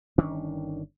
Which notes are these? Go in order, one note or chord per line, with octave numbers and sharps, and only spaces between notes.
G1 D#3 C#4 D4